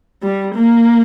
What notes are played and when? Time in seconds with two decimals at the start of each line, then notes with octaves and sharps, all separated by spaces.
0.22 G3
0.55 A#3